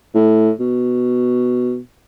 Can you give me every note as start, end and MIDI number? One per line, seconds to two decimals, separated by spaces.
0.15 0.51 45
0.60 1.78 47